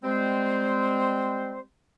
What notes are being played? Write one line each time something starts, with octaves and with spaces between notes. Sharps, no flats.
G3 G#3 C4 C5